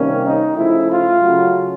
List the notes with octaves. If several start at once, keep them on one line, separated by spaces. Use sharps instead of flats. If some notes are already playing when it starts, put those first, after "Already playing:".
Already playing: C3 D#3 G3 A#3 C#4
D#4
C#3 F3 A3 E4
F4
C#3 F#3 A3